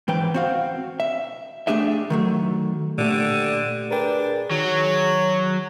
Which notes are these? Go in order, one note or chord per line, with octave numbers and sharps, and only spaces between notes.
G#2 E3 B4 G5
C4 F#4 F5
E5
A3 D4 G4 G#4 E5
D#3 F#3 A3
A#2 D3 A3 G4
D4 G#4 A#4 B4 G5
D#3 F#3 C#5